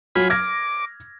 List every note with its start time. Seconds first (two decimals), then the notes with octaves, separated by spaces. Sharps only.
0.16 F#3 F4 G#5 B5
0.30 D6 F6 G#6 A#6